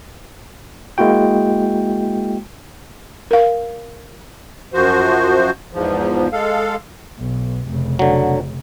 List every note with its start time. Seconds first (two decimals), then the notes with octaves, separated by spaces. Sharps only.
0.98 G#3 A#3 E4 F#4 G5
3.31 A#4 F5
4.74 F#2 F3 F#4 C5
5.73 E2 G#2 F3
6.32 G#3 A4 F5
7.19 B1
7.69 F1 C#3
7.99 D3 F#3